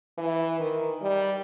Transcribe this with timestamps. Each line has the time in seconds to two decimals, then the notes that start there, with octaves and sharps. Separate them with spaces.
0.18 E3
0.59 D#3
1.01 G3